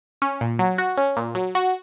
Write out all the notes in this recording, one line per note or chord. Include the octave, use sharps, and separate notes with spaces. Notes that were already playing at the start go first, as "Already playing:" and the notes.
C#4
A#2
F#3
F#4
C#4
A#2
F#3
F#4